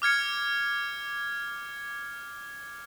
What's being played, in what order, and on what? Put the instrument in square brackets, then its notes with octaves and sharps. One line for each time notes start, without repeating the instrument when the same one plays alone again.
[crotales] D6 F6 G#6 C#7